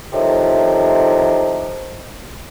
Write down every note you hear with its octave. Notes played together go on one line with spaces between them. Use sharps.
A2 C3 D#3 F3